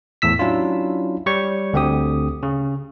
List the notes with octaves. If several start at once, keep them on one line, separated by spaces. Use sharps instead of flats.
E2 A2 E6 B6
F#3 C#4 D4 E4 F4
G3 C#5 C#6
D2 D3 C4 G4 D#6
C#3